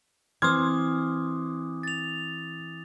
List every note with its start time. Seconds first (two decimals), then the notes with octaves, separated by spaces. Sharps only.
0.42 E3 C4 C6 D6 D#6 F6 G#6
1.83 A6 F7